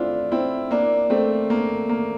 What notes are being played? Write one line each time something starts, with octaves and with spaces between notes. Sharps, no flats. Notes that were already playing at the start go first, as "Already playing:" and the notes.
Already playing: A3 C4 D4 E4 F4
C4 E4
A#3 D4
A3 C4
A#3
A#3